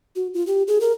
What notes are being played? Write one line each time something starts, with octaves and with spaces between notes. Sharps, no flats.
F#4
F4
G4
G#4
A#4